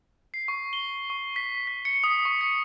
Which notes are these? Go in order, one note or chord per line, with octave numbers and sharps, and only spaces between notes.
C7
C#6
G7
C#6
B6
B6
C#7
D#6
C#6
C#7